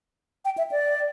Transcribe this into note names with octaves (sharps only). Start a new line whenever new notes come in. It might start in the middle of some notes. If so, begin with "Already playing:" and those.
G5
E5
D5